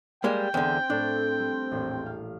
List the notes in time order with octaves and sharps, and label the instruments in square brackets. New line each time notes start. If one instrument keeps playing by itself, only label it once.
[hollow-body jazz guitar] G3 G#3 A#3 [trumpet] G5
[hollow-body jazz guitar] E2 D3 [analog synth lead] C4
[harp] A2 A3 A5 [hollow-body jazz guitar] D4
[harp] G3
A1 E2 A#2
F5